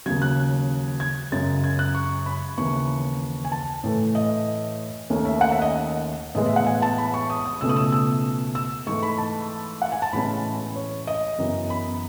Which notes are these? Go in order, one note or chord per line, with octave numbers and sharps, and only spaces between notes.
D#2 C#3 F#3 G#6
F#6
G#6
F#2 C#3 G#3 A6
G#6
F#6
C#6
B5
D#2 C#3 E3 C#6
G#5
A5
A2 E3 A3
D#5
D#2 D#3 A3 C#4
E5
F#5
E5
D#5
A2 E3 G#3 B3 D#5
E5
F#5
G#5
A5
B5
C#6
D#6
D#6
C#2 B2 A3 C#4 E6
D#6
E6
E6
E6
G#2 E3 A3 C#6
B5
A5
F#5
G#5
A5
A2 E3 G#3 C#4 B5
C#5
D#5
F#2 E3 B3
B5